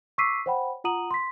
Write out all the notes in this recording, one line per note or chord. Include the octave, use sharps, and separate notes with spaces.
C#6 D6 E6 B6 C7 D#7
C5 C#5 F#5 G5 B5
F4 F#5 A#5 D#6 D#7 F#7
C6 B6